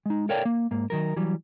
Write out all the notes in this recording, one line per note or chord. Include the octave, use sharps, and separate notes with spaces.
G#3 D#4
A4 A#4 C#5 D5 F5 G5
A#3
G#2 A#3
D#3 F#3 A#4
E3 F#3 G3